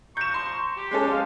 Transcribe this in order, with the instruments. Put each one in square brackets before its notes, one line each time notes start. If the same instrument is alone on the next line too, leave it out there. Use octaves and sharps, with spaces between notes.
[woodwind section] F3 A#5 C#6 [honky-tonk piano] G6 E7
[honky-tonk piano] C6
[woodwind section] G4
[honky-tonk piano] G#3 C#4 A4
[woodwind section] C5 D#5 F5